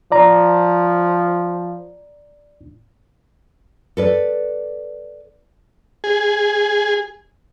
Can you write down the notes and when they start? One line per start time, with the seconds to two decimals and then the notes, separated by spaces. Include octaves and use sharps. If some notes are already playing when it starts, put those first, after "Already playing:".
0.12 F3 D5 A#5
3.97 A4 B4 D5
6.04 G#4